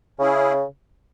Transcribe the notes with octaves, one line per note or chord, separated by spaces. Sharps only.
C#3 C#4 E4 G#4